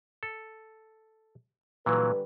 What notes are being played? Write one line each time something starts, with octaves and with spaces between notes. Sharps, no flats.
A4
A#2 D3 E3 F#3 G3 B4